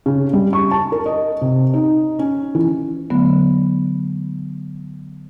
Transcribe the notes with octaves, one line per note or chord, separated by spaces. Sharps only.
C#3
G3
C#6
A5
A#4
D#5
C3
D#4
C#4
E3
D3 F#3 A3 B3